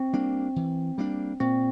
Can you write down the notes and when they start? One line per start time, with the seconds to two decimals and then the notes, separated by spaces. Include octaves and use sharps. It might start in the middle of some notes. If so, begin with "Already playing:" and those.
Already playing: C4
0.13 G3 A#3 D4
0.56 E3
0.98 G3 A#3 D4
1.40 A#2 C4